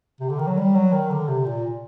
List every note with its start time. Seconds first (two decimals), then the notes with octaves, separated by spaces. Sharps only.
0.20 C3
0.29 D3
0.39 D#3
0.47 F#3
0.57 G3
0.74 F#3
0.93 D#3
1.10 D3
1.28 C3
1.46 A#2